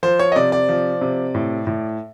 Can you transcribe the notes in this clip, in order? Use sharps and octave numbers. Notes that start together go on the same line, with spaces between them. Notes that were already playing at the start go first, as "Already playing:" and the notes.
F3 C5
C#5
D#5
C3 D5
D5
F3
C3
A2
A2